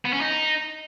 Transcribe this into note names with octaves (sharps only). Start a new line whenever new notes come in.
B3
C#4
D#4